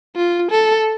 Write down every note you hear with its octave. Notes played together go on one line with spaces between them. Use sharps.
F4
A4